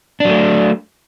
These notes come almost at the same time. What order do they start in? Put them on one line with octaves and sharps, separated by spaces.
D4 F#3 A3